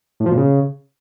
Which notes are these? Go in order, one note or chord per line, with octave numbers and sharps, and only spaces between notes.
A2
F3
A#2
C#3